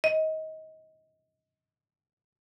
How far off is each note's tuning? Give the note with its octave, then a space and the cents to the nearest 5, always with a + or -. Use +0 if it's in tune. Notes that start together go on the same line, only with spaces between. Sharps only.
D#5 +25